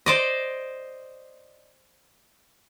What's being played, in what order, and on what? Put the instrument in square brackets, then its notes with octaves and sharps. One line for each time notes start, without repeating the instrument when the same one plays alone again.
[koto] C5 D5 D#5